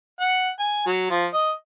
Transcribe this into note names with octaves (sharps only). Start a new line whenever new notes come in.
F#5
G#5
F#3
F3
D#5